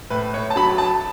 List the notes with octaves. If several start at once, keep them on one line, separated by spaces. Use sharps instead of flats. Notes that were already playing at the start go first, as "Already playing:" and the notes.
A2 B4
C#5
A5
F#3 B5
A5